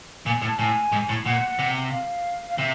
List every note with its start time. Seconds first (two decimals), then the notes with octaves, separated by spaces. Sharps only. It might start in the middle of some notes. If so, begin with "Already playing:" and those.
0.26 A#2 G#5
0.42 A2
0.48 A5
0.58 A2 G#5
0.92 G#2
1.09 A2
1.25 A#2 F#5
1.59 C3
1.91 F5
2.49 F5
2.58 C3 E5